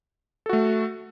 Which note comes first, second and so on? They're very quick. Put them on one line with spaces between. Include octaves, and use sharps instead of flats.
A4 F#4 A3